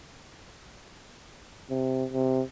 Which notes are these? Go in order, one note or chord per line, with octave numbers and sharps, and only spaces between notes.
C3
C3